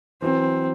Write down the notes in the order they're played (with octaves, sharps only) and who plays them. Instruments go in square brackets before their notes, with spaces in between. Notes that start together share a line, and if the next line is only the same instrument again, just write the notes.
[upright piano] E3 F#3 [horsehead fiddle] C4